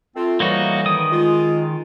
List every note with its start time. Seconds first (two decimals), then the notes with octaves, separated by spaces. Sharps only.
0.16 A3 C4 F4
0.40 A2 E3 G3 A#3 D#4 F#4
0.86 D#3 D#6
1.11 G#3 F4